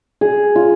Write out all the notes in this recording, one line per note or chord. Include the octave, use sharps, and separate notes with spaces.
G#4
F4